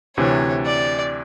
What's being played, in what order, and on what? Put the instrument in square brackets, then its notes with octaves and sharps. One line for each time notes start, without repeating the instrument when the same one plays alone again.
[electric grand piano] D2 C3 E3 [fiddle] C#5
[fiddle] D5